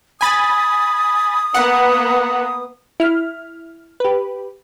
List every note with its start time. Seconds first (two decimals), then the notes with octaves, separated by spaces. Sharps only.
0.21 G#5 B5 D#6 A6
1.54 A#3 B3 F#5
3.00 E4 F6
4.00 G4 B4